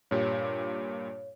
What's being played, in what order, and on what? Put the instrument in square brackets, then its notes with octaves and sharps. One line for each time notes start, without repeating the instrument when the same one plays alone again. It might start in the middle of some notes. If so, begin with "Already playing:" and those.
[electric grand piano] G2 A#2 G4 [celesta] C#5